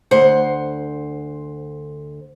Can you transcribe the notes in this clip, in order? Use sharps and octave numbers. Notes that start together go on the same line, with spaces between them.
D2 C5 F#5